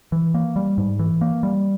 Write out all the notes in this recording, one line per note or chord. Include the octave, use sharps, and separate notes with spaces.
E3
A#3
G3
G#2
E3
A#3
G3